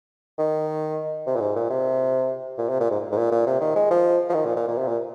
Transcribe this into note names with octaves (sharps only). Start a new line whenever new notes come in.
D#3
C3
A#2
G#2
A#2
C3
A#2
C3
A#2
G#2
G#2
A#2
A#2
C3
D#3
G#3
F3
F3
D#3
A#2
A#2
A#2
C3
A#2